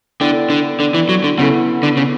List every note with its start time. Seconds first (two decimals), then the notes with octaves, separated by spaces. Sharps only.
0.21 D3 B3 E4 A4 D5 G5
0.50 D3
0.80 D3
0.94 E3
1.09 F#3
1.24 D3
1.38 C#3 B3 E4 A4
1.83 D3
1.97 C#3